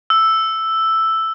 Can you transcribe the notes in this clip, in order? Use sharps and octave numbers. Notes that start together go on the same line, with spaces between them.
E6